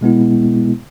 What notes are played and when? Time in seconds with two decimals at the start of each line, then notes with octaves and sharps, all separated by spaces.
0.01 B2 G#3 B3 E4